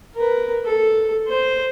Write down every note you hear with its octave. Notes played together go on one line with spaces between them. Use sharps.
A#4 B4
A4
C5